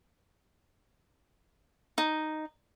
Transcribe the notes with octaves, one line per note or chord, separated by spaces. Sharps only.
D#4